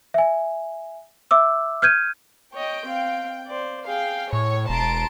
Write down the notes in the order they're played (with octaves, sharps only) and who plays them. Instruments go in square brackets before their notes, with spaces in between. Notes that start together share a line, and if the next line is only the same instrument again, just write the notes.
[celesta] E5 G#5
E5 D6 E6
F6 G6 G#6 D#7
[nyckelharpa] C#5 D#5 [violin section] G5
[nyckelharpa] C4 F5
C5 D5
[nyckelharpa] G#4 G5 [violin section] F5
[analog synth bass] A2 [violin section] C#5 [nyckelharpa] C#6
[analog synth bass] E1 [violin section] A5 C6 D7 [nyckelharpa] A#5